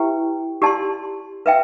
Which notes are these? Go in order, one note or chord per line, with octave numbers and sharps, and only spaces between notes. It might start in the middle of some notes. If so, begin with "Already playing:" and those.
Already playing: E4 G4 B4 E5 G5
G4 D5 A5 C6
B4 E5 G5